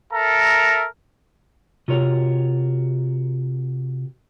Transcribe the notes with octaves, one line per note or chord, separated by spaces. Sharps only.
A4 A#4 E5 A#5
C3 F4 F#4 A#4 C#5